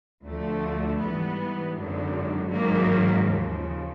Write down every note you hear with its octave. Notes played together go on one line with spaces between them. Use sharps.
D2 D3 F3 A3
G#2 E3 G3 B3
G#1 F#2 D3 F#3
G#1 G#2 D#3 F#3 A#3
D#2 C#3 F3